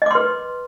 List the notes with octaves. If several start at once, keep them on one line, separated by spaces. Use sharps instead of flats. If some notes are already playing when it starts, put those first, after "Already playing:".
B4 D#5 C6 D6